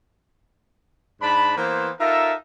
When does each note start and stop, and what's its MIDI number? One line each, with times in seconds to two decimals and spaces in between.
1.22 1.56 44
1.22 1.56 62
1.22 1.56 81
1.22 1.56 83
1.56 1.90 52
1.56 1.90 58
1.56 1.90 59
1.56 1.90 72
1.99 2.33 63
1.99 2.33 65
1.99 2.33 69
1.99 2.33 70
1.99 2.33 76